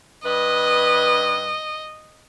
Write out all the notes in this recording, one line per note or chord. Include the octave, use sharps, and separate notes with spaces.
G2 B4 D#5